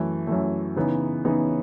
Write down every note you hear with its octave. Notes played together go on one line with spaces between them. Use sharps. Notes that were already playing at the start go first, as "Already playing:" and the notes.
Already playing: F#2 E3 A3
F#2 E3 A3
C#3 E3 B3 D#4
C#3 E3 B3 D#4